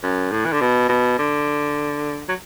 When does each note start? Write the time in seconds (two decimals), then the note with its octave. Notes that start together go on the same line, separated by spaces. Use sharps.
0.03 F#2
0.31 A2
0.45 E3
0.53 D3
0.61 B2
0.89 B2
1.19 D3
2.29 F#3